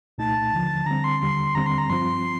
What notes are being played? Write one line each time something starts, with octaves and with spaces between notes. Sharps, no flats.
C2 A#2 A3 D#4 A5
D#2 D3 F3
D3 G3 C4 A#5
C6
D#2 D3 G3 C6
D#2 D3 G3 C4 A#5
C6
A#5
G2 F3 C4 F4 C6